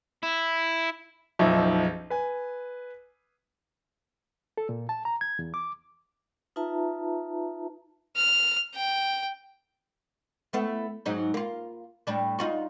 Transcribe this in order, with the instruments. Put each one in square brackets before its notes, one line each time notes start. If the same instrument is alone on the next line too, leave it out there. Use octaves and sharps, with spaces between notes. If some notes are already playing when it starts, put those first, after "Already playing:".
[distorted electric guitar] E4
[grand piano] F#1 B1 F3 D#4 E5
B4 G#5
[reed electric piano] A4
A#2
A5
A#5
G#6
E2
D6
[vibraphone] D#4 F4 B4 E5 A5 A#5
[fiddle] F6
G5
[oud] A3 B3 E4
G#2 F#3 D#4
A#3 F4
A2 G3 D4
D#4 F4 F#4